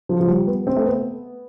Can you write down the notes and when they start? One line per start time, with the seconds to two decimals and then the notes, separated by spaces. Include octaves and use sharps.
0.09 F3
0.20 F3
0.27 G3
0.47 B3
0.67 C4
0.76 A3
0.86 B3